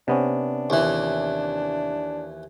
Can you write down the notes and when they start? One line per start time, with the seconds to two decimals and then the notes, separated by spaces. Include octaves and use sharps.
0.08 C3 B3 C#4 D4
0.70 D#2 E3